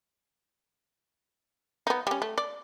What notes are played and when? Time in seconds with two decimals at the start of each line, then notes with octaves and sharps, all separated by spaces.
1.87 B3 D#4
2.07 G3 C#4
2.22 A3
2.38 D5